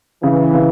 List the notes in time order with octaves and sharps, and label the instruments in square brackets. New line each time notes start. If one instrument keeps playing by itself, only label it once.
[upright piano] C#3 [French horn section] E3
[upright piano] C#3